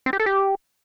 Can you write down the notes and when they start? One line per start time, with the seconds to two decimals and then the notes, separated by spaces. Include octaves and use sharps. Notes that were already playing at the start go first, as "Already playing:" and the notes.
0.06 C4
0.13 G4
0.20 A4
0.26 G4